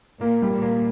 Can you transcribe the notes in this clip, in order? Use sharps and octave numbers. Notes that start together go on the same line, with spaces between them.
A#2 A#3
G3
A#2
A#3